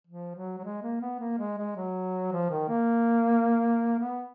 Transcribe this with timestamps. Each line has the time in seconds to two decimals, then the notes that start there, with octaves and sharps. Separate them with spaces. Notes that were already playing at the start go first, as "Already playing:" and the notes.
0.07 F3
0.36 F#3
0.58 F#3
0.64 G#3
0.83 A#3
1.01 B3
1.20 A#3
1.38 G#3
1.58 G#3
1.76 F#3
2.32 F3
2.50 D#3
2.69 A#3
3.99 B3